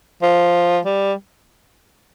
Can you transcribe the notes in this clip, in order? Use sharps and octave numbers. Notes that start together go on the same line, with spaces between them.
F3
G3